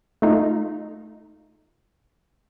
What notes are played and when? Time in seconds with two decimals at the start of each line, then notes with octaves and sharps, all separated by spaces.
0.22 A3 D#4 F4